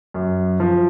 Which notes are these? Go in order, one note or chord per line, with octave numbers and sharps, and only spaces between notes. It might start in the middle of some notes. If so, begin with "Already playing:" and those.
F#2
F3